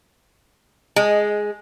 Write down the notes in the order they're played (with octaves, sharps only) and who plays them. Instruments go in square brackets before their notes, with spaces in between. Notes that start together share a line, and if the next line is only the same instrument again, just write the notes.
[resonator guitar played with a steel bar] G#3